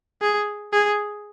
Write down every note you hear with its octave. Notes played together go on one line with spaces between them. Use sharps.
G#4
G#4